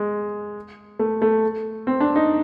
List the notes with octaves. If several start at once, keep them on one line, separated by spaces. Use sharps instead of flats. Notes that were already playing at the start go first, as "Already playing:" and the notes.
Already playing: G#3
A3
A3
C4
D4
D#4